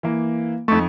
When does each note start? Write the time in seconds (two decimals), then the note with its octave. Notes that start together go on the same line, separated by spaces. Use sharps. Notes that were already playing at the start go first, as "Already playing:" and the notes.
0.03 E3 A#3
0.68 F2 A3 D#4 C#6